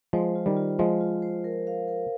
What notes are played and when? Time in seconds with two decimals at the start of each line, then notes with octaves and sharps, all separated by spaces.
0.13 F3 G#3 C5
0.35 F4
0.46 D#3 G3
0.57 F4
0.79 F3 G#3 C5
1.01 F4
1.22 C5
1.44 A#4
1.67 F5
1.88 A#4